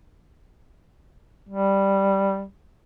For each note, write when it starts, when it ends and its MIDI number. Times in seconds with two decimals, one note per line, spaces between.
1.49 2.45 55